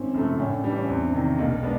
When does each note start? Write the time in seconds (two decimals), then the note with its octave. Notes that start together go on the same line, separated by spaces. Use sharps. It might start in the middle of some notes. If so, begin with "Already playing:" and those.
Already playing: G#1 C4 C#4
0.14 F#2 C#3 F3 A3
0.38 A2 C#4
0.51 D4
0.64 E3 G3 D4
0.76 C#4
0.88 E2 C4
1.05 D4
1.13 C3 D#3
1.39 B1 A#3
1.63 G#3 B3 D4